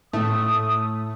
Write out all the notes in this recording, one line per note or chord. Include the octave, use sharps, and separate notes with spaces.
A2 A3 D#6